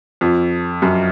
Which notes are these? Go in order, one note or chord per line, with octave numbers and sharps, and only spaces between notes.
F2
F#2